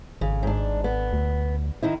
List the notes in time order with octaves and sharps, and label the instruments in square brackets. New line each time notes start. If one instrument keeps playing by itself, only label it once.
[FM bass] G#1 [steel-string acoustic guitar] C#3
[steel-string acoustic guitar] G#2 D4
B3
[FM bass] D2
[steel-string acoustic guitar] D#3 D#4 E4